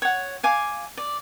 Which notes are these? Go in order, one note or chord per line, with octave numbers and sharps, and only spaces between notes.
C#5 F#5
F5 G#5 D6
D5